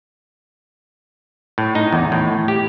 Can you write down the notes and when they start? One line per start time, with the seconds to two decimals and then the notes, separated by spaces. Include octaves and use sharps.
1.58 A2
1.75 D#4
1.93 E2
2.12 A2
2.48 G4